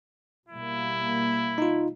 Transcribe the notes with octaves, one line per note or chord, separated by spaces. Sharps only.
B2 G3 A#3 E4
D#4 F4